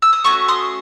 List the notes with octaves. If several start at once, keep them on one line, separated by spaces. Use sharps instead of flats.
E6
D#6
A3 C#4 F#4 C#6
C6 D#6